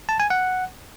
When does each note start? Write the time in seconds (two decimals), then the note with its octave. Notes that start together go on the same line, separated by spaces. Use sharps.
0.09 A5
0.20 G#5
0.30 F#5